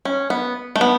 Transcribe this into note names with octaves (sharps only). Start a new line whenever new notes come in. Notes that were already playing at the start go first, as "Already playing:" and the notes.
C#4
B3
A3
B3